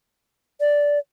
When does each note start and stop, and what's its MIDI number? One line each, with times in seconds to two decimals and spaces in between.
0.60 0.99 74